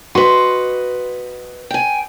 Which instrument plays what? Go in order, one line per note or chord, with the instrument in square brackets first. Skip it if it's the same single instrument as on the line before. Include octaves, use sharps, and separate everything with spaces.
[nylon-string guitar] F#4 [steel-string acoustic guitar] B4 D#5 [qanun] C6
[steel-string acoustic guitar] G5 G#5